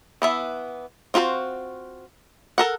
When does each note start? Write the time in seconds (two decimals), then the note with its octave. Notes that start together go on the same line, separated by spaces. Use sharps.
0.22 E3 B3 E5
1.14 C4 F4 F#4 B4 C5
2.58 A4 A#4 F#5